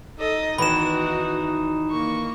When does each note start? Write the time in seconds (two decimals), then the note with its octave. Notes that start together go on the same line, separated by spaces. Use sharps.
0.19 D#4 A4 D#5
0.58 E2 D#3 E3 F#4 B5 E7
1.91 A#3 C#6